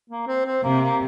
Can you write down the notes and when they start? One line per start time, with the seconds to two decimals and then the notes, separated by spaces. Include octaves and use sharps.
0.10 A#3
0.27 C4
0.46 C4
0.63 C3 A#3
0.81 A#3